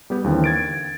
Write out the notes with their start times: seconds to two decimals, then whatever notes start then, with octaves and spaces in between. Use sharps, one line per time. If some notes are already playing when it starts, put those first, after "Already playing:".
0.10 G3 B3 G4
0.24 D#2 D3 E3 C4
0.44 G#6 A6 D7